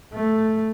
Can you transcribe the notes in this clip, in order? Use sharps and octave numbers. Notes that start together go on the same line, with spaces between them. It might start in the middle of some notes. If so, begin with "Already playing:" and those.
A3